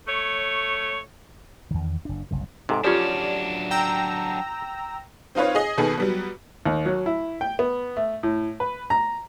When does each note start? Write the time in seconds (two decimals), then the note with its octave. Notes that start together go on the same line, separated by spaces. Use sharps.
0.07 A3 C#5
1.71 E2 D#3
2.05 F#1 D4
2.31 F#1 C2 C#3
2.69 G#2 C3 D#4 A4 G#5
2.84 F3 F#3 C#4 D4 F4 G4 C#5 D5
3.71 G5 A#5 E6
5.35 C4 D#4 F4 B4 C#5
5.55 G#4 D#5 G#5
5.77 B2 D#3 B3 G#4 A4
5.98 F#3 G3 B3
6.66 D#2
6.85 F#3
7.06 E4
7.41 G5
7.59 B3
7.97 A3
8.23 A2
8.60 B4
8.90 A#5